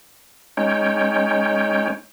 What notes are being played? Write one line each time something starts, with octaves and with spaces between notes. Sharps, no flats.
G#3 C#4 D#4 C#5 G5